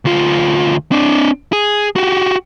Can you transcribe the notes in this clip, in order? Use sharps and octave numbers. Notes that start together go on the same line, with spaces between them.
D2 F4
C4 D4
G#4
F#4 G4